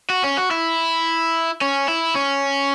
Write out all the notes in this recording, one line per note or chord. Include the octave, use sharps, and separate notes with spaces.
F#4
C#4
F#4
E4
C#4
E4
C#4